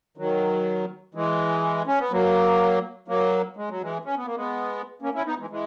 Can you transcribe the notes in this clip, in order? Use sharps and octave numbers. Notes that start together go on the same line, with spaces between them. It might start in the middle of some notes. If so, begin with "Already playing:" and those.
D#3 F#3
E3 G#3
C#4
B3
F#3 A#3
F#3 A#3
G#3
F#3
E3 G#3
C#4
B3
A#3
G#3 B3
A#3 C#4
C#4 E4
B3 D#4
E3 G#3
E3 G#3